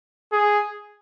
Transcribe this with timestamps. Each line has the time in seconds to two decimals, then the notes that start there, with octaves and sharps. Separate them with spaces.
0.33 G#4